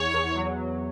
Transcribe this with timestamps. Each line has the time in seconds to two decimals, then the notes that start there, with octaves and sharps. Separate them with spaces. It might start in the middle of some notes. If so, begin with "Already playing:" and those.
Already playing: E2 C#5
0.14 E2
0.36 F#3